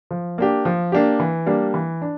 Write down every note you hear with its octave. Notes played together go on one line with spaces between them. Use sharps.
F3
A#3 D4 G4
F3
A#3 D4 G4
E3
G3 A#3 D4
E3
D4